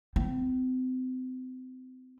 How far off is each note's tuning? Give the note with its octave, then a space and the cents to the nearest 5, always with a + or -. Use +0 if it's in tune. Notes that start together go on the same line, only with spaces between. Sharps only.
C4 -35 E4 +0